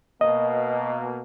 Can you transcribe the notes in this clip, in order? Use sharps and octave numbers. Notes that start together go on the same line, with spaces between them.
B2 A#3 D#5